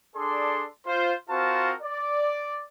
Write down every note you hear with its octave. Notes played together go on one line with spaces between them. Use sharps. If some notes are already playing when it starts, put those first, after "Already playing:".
D4 G#4 A4 D5 C6
F4 C5
C4 F4 F#4 A#4 C5 A5
D5